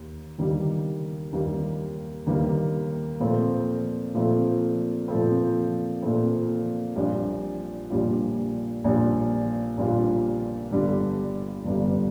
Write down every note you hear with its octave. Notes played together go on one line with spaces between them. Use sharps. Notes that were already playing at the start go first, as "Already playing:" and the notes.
Already playing: D#2
D#2 D#3 G3 A#3
D#2 D#3 G3 A#3
D#2 D#3 G3 A#3
A#2 F3 A3 C4
A#2 F3 A3 C4
A#2 F3 A3 C4
A#2 F3 A3 C4
A#1 A#2 G3 D4 F4
A#1 A#2 G3 D4 F4
A#1 A#2 G3 D4 F4
A#1 A#2 G3 D4 F4
G1 G2 D3 G3
G1 G2 D3 G3